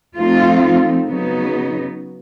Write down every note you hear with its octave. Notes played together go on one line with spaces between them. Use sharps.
F3 A3 C4 D#4 F4
C#3 F#3 B3 D#4